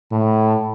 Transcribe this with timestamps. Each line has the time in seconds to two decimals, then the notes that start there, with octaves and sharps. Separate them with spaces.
0.12 A2